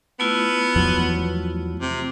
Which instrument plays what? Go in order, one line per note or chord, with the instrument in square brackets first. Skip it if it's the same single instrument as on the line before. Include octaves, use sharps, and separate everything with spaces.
[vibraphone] A3 E4 F4 [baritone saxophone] B3
[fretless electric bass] E2 F3 F#3
[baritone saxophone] C3